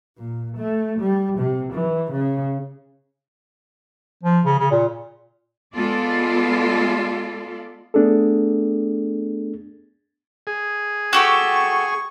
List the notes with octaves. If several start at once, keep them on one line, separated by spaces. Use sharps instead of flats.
A#2
A3
G3
C3
E3
C#3
F3
C#3
C#3
A#2
G#3 B3 F4 A4 D5
A3 B3 D4 G#4 A4
G#4
F#4 G4 A4 C#6